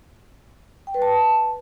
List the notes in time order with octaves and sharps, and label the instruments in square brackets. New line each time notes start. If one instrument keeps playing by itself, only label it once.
[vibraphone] G5
B4
A5